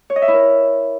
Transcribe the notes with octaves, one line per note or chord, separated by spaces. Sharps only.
C#5
D#5
E5
E4
A#4